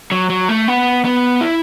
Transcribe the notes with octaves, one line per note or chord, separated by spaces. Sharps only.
F#3
F#3
A3
B3
B3
E4